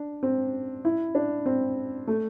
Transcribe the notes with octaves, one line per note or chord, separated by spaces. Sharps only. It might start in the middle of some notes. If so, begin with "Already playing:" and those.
Already playing: D4
C4
E4
D4
C4
A3